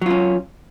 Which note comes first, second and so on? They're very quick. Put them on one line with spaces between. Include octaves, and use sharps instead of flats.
F#3 F4 C#4